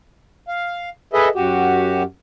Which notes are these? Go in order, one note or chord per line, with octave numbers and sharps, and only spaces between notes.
F5
G#4 A4 B4 D#5 E5
F#2 F#4 G4